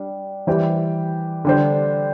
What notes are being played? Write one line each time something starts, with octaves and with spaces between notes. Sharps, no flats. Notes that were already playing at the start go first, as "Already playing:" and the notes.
Already playing: G3 D4
E3 G3 E4 G4 C5
D3 G3 D4 C5